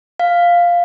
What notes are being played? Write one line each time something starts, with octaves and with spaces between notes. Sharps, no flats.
F5